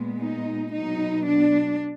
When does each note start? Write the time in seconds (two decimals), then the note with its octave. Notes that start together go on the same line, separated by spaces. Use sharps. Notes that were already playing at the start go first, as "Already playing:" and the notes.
Already playing: A#2 G#3 B3
0.20 D#4
0.73 B2 F#3 B3 D#4
1.26 D4